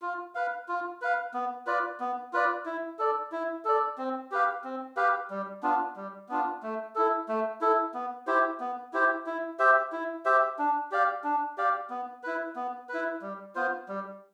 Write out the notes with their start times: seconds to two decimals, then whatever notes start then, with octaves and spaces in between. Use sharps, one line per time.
0.02 F4
0.35 B4 F5
0.68 F4
1.02 B4 F5
1.34 B3
1.66 F4 B4 D5
2.00 B3
2.33 F4 B4 D5
2.65 E4
2.99 A4 D5
3.32 E4
3.65 A4 D5
3.98 C4
4.32 G4 B4 F5
4.64 C4
4.97 G4 B4 F5
5.30 G3
5.63 B3 D4 F4
5.96 G3
6.29 B3 D4 F4
6.63 A3
6.95 E4 A4
7.29 A3
7.61 E4 A4
7.94 B3
8.27 E4 G4 C5
8.60 B3
8.93 E4 G4 C5
9.26 E4
9.59 G4 C5 E5
9.92 E4
10.25 G4 C5 E5
10.59 D4
10.91 G4 D5 F5
11.24 D4
11.58 G4 D5 F5
11.90 B3
12.23 E4 B4
12.56 B3
12.89 E4 B4
13.22 G3
13.55 B3 F4 C5
13.88 G3